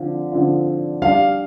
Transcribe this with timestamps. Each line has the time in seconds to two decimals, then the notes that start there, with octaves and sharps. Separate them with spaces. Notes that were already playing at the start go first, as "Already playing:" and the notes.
Already playing: D3 F3 C4 F4
0.32 D3 F3 C4 F4
1.02 G3 D4 G4 F5